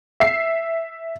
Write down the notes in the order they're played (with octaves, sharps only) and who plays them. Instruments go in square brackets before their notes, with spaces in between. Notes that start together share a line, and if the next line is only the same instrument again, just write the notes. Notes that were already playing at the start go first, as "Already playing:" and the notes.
[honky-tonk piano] E5 C7